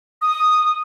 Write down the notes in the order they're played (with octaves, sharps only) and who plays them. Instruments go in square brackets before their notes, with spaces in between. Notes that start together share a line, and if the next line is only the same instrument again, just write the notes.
[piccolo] D#6